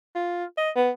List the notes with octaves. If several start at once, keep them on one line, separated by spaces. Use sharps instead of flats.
F4
D#5
B3